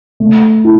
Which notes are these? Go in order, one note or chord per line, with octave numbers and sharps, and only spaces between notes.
A3
E4